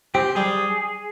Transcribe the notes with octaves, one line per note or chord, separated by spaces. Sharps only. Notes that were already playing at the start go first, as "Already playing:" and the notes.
C4 G4
G3 G#4